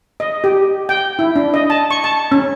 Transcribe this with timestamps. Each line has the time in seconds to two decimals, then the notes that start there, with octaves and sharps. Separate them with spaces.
0.20 D#5
0.44 G4
0.89 G5
1.19 E4
1.36 D4
1.54 D#5
1.70 A5
1.91 C#6
2.04 A5
2.32 C#4